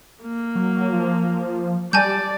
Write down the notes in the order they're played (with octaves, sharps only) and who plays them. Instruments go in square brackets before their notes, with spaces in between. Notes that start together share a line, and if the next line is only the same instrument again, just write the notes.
[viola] A#3
[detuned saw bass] F#3
F3
[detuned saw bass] G3 [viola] D5 [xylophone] G#5 A5 G6